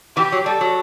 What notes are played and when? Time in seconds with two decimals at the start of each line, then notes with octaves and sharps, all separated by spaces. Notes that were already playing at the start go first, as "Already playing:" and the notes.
0.17 E3 G4
0.32 F#3
0.46 G3 A4
0.61 F#3